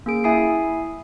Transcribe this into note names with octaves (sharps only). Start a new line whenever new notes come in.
A#3 C#4 G#4 D7
E4 E5 G#5 B5 D#6 C7